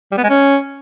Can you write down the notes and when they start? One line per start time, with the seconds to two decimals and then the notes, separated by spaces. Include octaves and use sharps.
0.12 G3
0.18 B3
0.24 G#3
0.30 C#4